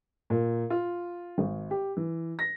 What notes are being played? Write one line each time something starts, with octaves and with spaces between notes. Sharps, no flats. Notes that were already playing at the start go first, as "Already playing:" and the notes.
A#2
F4
G#1
G4
E3
A#6